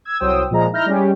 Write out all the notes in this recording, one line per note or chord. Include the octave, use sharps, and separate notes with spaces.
E6 G#6
C2 F#3 C5 G5 D#6 E6
A#2 F3 G#3 A#5
D#4 E4 F6 G6 A#6
G3 G#3 C#4 G4